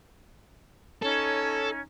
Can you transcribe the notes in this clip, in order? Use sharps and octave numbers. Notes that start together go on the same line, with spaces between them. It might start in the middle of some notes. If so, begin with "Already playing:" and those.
C#4 D#4 A4 C#5